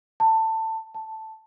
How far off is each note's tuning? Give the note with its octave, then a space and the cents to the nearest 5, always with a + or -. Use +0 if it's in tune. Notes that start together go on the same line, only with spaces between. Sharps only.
A5 +20
A5 +0